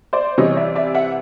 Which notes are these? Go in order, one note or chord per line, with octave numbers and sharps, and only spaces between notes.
C5 D5
C3 E3 G3 C#5 D#5
D5 E5
D5 E5
E5 F#5